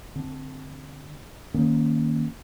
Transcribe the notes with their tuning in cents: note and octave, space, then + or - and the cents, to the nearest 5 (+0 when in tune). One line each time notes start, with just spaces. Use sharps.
D3 +0 C4 +0
D#3 +0 A#3 +0 C#4 +0